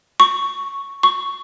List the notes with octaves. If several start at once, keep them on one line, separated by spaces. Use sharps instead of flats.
C#6
C#6